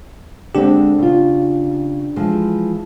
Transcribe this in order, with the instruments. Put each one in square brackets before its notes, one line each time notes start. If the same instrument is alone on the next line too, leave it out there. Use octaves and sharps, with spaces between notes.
[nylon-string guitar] D3 G#3 C4 [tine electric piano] D4 G4
[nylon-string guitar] C#3 F4
E3 F3 G#3